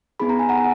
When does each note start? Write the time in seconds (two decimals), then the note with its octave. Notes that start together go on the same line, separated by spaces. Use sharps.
0.20 B3 D#4 G#4 B5
0.29 A#5
0.39 G#5
0.49 F#5 A#5